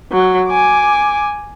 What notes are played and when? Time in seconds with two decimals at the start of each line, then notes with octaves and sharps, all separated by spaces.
0.12 F#3
0.48 G#5 D6